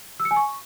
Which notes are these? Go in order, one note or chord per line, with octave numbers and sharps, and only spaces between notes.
E6
C#7
G#5
C#6